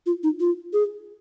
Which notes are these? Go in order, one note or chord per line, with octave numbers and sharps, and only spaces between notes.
F4
D#4
F4
G#4